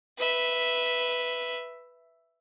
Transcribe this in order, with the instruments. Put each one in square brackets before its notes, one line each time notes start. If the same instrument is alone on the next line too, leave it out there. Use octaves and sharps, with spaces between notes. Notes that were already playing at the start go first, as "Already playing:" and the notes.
[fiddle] B4 E5